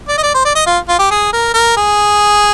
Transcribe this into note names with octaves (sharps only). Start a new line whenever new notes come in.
D5
D#5
D5
C5
D5
D#5
F4
F4
G4
G#4
A#4
A#4
G#4